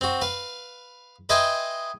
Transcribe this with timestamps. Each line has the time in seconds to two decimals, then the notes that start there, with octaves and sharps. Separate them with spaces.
0.01 C4 F#4
0.21 B4 F5
1.29 B4 D#5 E5 G5 G#5 C6